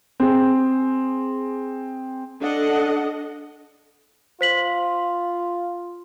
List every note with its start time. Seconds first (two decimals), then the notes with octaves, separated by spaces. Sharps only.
0.20 C4 G#4
2.41 D4 A4 D#5 F#5
4.41 F4 C5 B6 F#7